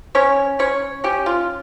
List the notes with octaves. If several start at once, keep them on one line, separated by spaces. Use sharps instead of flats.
C#4 C#5
C#4 C#5
C#4 G4
F4